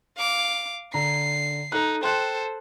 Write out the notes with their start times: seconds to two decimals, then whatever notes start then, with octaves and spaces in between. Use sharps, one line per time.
0.18 F5 D6
0.94 D3 A#5 C7
1.72 D#4 A4 F#6
2.03 A4 C5 G5 C6 F#6